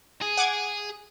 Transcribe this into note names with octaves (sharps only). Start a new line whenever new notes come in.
G#4
F#5 D6 G#6